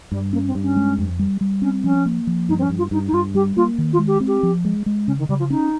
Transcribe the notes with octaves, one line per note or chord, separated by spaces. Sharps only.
G2 G3
A#3 C#4
C4
G2
C#4
G#3
F2
G3
G3
C4 C#4
F3 C#4
A#3
F3
G2 D#4
C4
C#4
G2
F4
G2 D#4
D#4
G2 F4
G3 G4
A#3 F4
D#3
F4
G#3
G4
C4
G4
F3
G#3
G#3
C#3 C#4
D#3
C#3 G3
F3
C#4 D#4